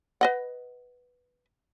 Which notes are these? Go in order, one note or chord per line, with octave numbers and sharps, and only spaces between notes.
B4 D#5 F#5